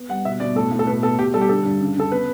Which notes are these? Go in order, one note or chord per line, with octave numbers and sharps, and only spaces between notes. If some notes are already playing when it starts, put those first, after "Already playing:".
Already playing: B3
G3 F#5
B2 E5
B2 D5
A2 A4
A2
A4
B2 B4
B3 A4
B2 G4
G3 A4
G4
D3 A4
G2
C#3
C#3 A4
B3 B4